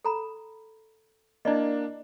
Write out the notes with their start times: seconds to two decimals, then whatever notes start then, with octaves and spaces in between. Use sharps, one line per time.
0.05 A4 A#5 B5
1.45 A#3 D4 E4 D5 D#5